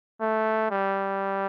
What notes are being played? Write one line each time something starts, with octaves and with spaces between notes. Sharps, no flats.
A3
G3